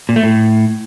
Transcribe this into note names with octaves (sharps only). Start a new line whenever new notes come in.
A#2
A3
A2